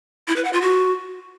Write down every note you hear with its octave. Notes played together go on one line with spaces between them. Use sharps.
E4
B4
F#5
F4
F#4